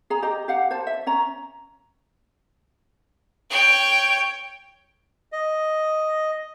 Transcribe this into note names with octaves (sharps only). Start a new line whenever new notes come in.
G#4 A#5
G4 D#5 A#5
G4 F5 F#5
C5 A5
E5
C#4 C#5 A#5
C#5 G5
D#5